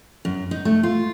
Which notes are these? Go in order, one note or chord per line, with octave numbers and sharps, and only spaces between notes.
F#2
D#4
A3
F4